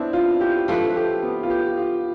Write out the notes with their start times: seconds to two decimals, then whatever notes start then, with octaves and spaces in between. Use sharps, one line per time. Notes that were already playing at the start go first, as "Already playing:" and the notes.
Already playing: B3 C4 D4 E4
0.13 F4
0.41 G4
0.68 F3 A3 E4 F4 B4
0.96 G4
1.23 B3
1.43 F4
1.50 G4
1.77 F4